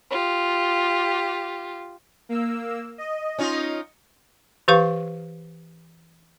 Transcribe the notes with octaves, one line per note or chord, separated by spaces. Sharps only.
F4 G4
A#3 E6
D#5
C#4 D#4 F4
E3 G4 B4 F5 C#6